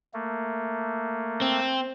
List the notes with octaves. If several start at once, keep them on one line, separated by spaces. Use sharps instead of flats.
A3 A#3
C4